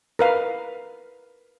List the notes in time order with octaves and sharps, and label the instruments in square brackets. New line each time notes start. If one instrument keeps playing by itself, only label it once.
[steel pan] A#4 B4 F5